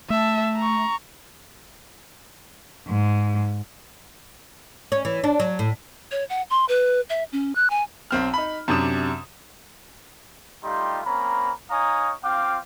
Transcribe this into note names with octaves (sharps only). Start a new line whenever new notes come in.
A3 E5 A5
A#5 C#6
G#2
C#4
E3
D4
F#3
A2
C#5
F#5
C6
B4
E5
C#4
F#6
G#5
B1 C4 F6
D#4 B5
F#2 C3 D4 D#6 E7
G3 A3 D#4 F4 G4 C6
A#3 C4 C#4 A#5 B5
D#4 C#5 F5 G#5 A#5 D#6
C4 F4 F5 G5 D6